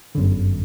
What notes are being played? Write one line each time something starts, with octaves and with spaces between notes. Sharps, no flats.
G1 F#2 D3